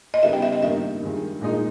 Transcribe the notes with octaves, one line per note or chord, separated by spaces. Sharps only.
D#5
C#3 G3 B3 D#4 E5
G5
E5
D#5
G2 D#3 A#3 D#4 E5
G2 D#3 G#3
A#2 G#3 D#4